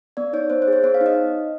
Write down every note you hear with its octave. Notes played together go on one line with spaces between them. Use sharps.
B3 D5
D#4 C#5
B3 C5
C5
G#4
C#5
B3 C5
F5
D#4
D#5